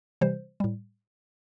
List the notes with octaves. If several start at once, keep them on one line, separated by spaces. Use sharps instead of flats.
C3 E3 G3 C5
A2 G3